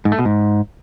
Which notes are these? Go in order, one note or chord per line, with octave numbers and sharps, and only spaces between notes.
G#2
A3
B2
G#2